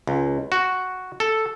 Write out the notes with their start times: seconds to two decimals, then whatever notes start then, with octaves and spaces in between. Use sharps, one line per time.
0.07 C#2
0.52 F#4
1.20 A4